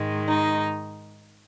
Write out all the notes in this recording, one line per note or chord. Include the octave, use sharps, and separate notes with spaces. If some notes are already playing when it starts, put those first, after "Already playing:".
Already playing: G#2 D#3 G#3
D#4